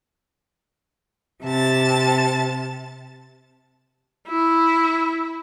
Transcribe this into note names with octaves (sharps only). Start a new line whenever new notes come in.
C3 A5 A6
E4